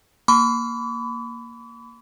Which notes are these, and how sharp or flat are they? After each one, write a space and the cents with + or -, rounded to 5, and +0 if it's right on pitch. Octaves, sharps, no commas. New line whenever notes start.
A#3 +0 B5 +25 D6 -45